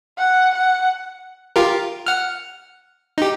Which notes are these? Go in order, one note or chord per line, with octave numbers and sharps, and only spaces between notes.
F#5
F#5
F4 G4 A#4
F#5 F6
D#4 G4